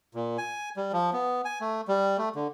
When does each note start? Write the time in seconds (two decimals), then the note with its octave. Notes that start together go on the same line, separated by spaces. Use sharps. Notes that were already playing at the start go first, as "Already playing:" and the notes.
0.15 A#2
0.38 G#5
0.77 G3
0.93 F3
1.13 B3
1.45 G#5
1.61 A3
1.88 G3
2.18 A3
2.36 D3